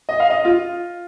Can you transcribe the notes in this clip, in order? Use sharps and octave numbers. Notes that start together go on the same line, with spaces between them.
D#5
F5
D#5
F4